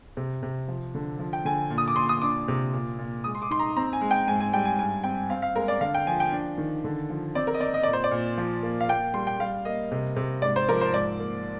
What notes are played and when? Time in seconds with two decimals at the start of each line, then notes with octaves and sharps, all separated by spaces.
0.17 C3
0.43 C3
0.68 F3
0.95 D3
1.19 F3
1.33 G5
1.45 D3 G#5
1.70 A#2
1.78 D#6
1.88 D6
1.96 A#2 C6
2.09 D#6
2.22 D4 D6
2.48 C3
2.73 A#2
2.98 A#2
3.24 G#3 D#6
3.35 C6
3.42 D6
3.50 D#4 C6
3.59 A#5
3.76 C4 A#5
3.93 G#5
4.01 G#3
4.11 G5
4.28 G#2 G#5
4.40 G#5
4.53 G3 G5
4.65 G#5
4.79 G2 G#5
5.04 C4 G5
5.30 C4 F5
5.42 F5
5.56 G#3 A#4
5.68 D5
5.81 D3 F5
5.95 G5
6.07 F3 G#5
6.20 G5
6.32 D4
6.58 D#3
6.84 D3
7.10 F3
7.35 C4 D5
7.47 A#4
7.54 D#5
7.60 C4 D5
7.74 D#5
7.83 A#2 D5
7.93 C5
8.04 D5
8.11 A#2
8.37 F3
8.63 A#3
8.80 F5
8.88 A#3 G5
9.14 G3 C6
9.27 G5
9.39 G3 F5
9.65 A#3 D#5
9.92 C3
10.16 C3
10.42 G#2 D5
10.56 C5
10.69 F3 A#4
10.81 C5
10.94 G#2 D5
11.20 A#3